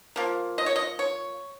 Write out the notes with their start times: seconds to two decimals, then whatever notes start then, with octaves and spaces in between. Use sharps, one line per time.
0.16 F3 A#3
0.58 D#5
0.66 C#5
0.76 D#5
0.99 C#5